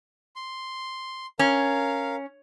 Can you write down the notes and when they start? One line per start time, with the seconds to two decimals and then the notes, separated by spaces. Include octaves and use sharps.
0.36 C6
1.39 C#4 A#4 F5